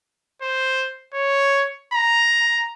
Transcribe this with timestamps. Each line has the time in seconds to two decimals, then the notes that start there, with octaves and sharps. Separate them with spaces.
0.42 C5
1.14 C#5
1.94 A#5